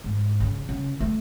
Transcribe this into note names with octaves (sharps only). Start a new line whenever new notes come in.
G#2
C#3
C#3
A3